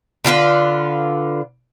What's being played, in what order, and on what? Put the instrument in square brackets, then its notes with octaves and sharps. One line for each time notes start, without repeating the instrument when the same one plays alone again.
[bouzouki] D3 F4 G4 B4